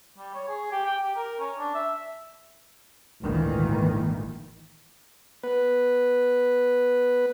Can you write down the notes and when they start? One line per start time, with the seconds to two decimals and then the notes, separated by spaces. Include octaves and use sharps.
0.18 G3
0.34 C#5
0.48 G#4
0.72 G4
0.85 G5
1.02 G4
1.16 A#4
1.40 C#4
1.59 D4
1.75 E5
3.23 G#1 D2 A#2 D#3 E3
5.43 B3 B4